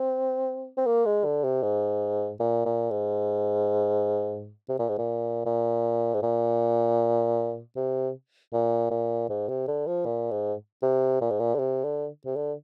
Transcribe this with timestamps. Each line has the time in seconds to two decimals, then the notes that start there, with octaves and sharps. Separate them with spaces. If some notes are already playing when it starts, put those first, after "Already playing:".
Already playing: C4
0.77 C4
0.86 A#3
1.05 G#3
1.25 D3
1.43 C3
1.63 G#2
2.39 A#2
2.65 A#2
2.90 G#2
4.69 C3
4.79 A#2
4.89 G#2
4.98 A#2
5.46 A#2
6.14 G#2
6.22 A#2
7.76 C3
8.53 A#2
8.91 A#2
9.29 G#2
9.48 C3
9.67 D3
9.87 F3
10.05 A#2
10.31 G#2
10.82 C3
11.21 A#2
11.30 G#2
11.39 A#2
11.54 D3
11.58 C3
11.84 D3
12.25 C3
12.36 D3